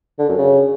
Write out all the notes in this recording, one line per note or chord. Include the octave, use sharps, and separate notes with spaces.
D3
F#2
C#3